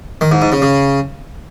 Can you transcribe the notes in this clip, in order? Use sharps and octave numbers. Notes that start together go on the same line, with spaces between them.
D#3
G#2
G#2
C#3
C#3